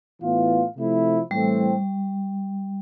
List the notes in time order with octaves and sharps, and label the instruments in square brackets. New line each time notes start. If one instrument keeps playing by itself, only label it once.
[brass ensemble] A2 E3 B3 F4
C3 F3 A3 E4
[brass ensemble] A2 E3 A3 C4 [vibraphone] G3